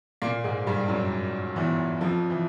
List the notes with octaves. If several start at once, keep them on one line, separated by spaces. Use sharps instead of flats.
A#2 A#3
G#2 G#3
G2 G3
F#2 F#3
E2 E3
F2 F3
E3